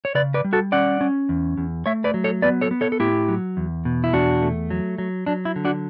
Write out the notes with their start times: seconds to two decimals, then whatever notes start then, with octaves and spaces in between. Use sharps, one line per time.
0.05 C#5
0.15 C#3 B4 D5
0.34 B4 D5
0.44 G3
0.53 F#4 A4
0.72 C#4 D5 F#5
1.01 C#4
1.29 E2
1.57 E2
1.86 A3 C#5 E5
2.04 B4 D5
2.14 F#3
2.24 A4 C#5
2.42 B3 B4 D5
2.61 A4 C#5
2.71 B3
2.81 A4 C#5
2.92 A4
3.00 A2 E4 G4
3.28 F#3
3.57 E2
3.85 B2
4.04 E4
4.13 E2 D4 F#4
4.42 A3
4.70 F#3
4.98 F#3
5.26 F#3 D4
5.45 E4
5.56 D3
5.65 D4 F#4